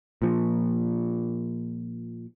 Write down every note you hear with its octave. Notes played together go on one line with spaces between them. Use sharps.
A#2 F3